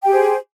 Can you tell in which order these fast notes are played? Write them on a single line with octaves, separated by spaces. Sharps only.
G5 G4 G#4 C5